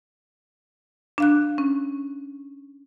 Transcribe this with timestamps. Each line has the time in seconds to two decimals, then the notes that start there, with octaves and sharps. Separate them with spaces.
1.18 D4 F5 F#6
1.58 C#4